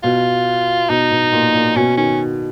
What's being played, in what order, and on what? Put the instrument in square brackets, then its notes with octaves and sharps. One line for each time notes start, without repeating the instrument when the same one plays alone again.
[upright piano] B2 [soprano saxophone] F4
[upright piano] B2 [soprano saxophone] D#4
[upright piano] B2
A#2
A#2
[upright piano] B2 [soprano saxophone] C#4
[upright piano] D#3 [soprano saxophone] C#4